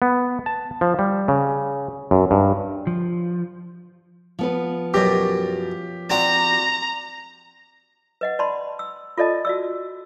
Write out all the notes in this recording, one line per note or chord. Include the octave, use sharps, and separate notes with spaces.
B3
A5
F3
G3
C#3
F#2
G2
F3
F3 B3 B4
F#2 B2 G4
C4 D4 F#4 A#5
B4 D#5 F#5
D5 A5 B5 C6
E6
F4 A4 D5 D#5 A5
F#4 D5 E6